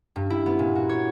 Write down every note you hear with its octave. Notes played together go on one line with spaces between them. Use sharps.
G2
E4
B3
A#2
F#4
C#5